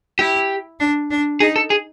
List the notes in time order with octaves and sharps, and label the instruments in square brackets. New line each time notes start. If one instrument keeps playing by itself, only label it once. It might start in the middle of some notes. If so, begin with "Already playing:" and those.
[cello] E4 [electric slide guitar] G4
[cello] D4
D4
[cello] D#4 [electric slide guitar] G#4
[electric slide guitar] A4
G#4